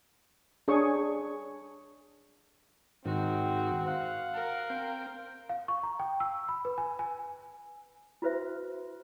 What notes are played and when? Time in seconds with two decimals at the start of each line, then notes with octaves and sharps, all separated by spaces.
0.68 D4 G#4 C#5 G#5 C#6
3.05 G#2 D#3 C4 F#4
3.87 F5 F#5
4.35 A#4
4.70 C4 G5
5.49 F5
5.68 C#6
5.83 A#5
5.99 G5
6.20 E6
6.49 B5
6.65 B4
6.78 G#5
6.99 G#5
8.22 E4 F#4 B4 C5 E5